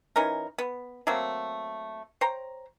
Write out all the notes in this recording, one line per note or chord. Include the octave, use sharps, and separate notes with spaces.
E3 C#4 D#4 A#4
B3
F#3 A3 A#3 C4
C5 C#5 G5 A#5